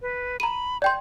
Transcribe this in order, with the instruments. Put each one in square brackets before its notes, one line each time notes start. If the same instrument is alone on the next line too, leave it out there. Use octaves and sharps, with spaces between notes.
[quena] B4
[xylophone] A#5 D#7 [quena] B5
[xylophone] D5 G5 C6 [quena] G6